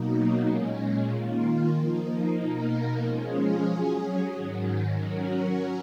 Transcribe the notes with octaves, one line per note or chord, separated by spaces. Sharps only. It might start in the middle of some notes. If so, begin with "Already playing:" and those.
Already playing: B2 F#3 A#3 D#4
A#2 G#3 C#4
D#3 A#3 F4
F3 A#3 D#4
B2 A#3 D#4 A#4
F3 G#3 C#4 F4 G#4
F#3 C#4 G#4
G#2 D#3 F#3
F#3 C#4 F#4 A#4